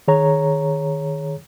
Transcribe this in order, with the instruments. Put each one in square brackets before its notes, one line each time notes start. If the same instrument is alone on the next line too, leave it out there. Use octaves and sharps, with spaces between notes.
[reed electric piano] D#3 G#4 C#5 A#5